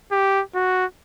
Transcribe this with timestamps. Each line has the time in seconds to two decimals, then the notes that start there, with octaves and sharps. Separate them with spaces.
0.12 G4
0.55 F#4